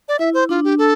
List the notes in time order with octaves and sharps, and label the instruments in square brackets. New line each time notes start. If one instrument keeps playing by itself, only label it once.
[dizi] D5
[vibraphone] E4 [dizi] E5
[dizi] C5
[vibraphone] D4 [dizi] F4
[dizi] G4
[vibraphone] D4 [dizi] A4